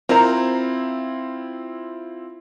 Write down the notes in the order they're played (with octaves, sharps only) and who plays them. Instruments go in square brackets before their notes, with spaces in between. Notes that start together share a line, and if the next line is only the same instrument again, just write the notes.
[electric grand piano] C4 E4 F4 [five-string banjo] A#4 C5 A#5